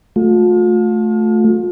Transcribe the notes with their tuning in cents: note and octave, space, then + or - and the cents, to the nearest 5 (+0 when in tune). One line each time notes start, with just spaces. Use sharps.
A3 -10 F4 +40